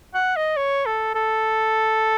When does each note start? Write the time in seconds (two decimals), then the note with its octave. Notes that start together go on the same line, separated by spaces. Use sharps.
0.14 F#5
0.36 D#5
0.56 C#5
0.86 A4
1.14 A4